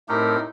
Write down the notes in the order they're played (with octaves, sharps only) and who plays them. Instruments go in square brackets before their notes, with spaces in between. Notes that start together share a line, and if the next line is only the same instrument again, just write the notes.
[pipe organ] A2 A3 C4 G4 A#4 [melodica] D#4